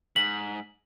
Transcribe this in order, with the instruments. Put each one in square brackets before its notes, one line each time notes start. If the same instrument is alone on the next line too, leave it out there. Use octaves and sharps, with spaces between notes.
[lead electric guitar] G#2 [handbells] B6 [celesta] F#7